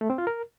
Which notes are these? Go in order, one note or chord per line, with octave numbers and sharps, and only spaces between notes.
A3
C4
F4
A#4